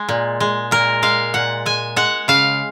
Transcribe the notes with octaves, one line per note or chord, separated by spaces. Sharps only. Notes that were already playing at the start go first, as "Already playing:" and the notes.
Already playing: G#3
A#2
G#3
A#2 A#4
G#3 F5
A#2 F#5
G#3 G#5
G#3 F#5
C#3 F5